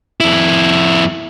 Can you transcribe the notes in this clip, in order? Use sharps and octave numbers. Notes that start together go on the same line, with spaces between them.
F2 E4